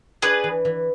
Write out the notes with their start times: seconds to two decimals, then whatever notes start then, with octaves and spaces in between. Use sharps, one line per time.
0.22 D4 G#4 B4
0.44 E3
0.65 E3